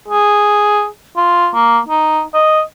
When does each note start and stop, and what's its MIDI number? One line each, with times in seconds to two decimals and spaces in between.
0.08 0.86 68
1.17 1.48 65
1.54 1.79 58
1.88 2.22 63
2.34 2.61 75